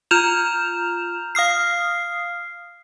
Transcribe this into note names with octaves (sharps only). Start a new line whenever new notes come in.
F4 A#5 F6 G6 E7 F7
F5 D#6 F6 C7